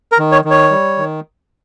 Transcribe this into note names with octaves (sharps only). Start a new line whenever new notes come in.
A#4
D#3
C#5
D#3
C#5
G3
D#3